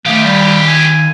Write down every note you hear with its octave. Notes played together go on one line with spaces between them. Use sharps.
D#3 A3 G4 G#4 F5
G3
G#5